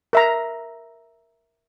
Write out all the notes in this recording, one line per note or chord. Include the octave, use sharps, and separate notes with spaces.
A#4 E5 A#5